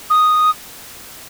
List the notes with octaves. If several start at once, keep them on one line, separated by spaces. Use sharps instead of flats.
D#6